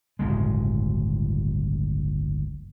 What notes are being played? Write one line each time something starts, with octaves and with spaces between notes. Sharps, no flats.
D1 G1 C#3 G#3